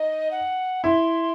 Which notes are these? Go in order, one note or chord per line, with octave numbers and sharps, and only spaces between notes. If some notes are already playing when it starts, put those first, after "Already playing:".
Already playing: D#4 D#5
F#5
E4 C6